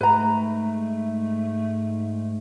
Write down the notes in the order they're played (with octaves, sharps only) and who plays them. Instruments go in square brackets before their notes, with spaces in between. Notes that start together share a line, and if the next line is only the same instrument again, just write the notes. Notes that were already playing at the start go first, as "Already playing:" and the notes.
[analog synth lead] G#2 [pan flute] A3 [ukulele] B4 A#5